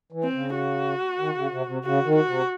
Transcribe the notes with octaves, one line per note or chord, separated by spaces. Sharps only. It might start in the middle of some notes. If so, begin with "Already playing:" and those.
E3
C4
C#3
F#4
D#3
C#3
C3
C3
C#3 F#4
D#3
F#4
C3